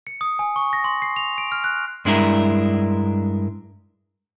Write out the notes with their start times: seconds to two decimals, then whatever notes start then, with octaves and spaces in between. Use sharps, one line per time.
0.07 C#7
0.21 D#6
0.39 G#5
0.56 C#6
0.73 A#6
0.84 C6
1.02 C7
1.16 F7
1.38 D7
1.52 F6
1.64 F#6
2.05 G2 G#3 D4 E4 A#4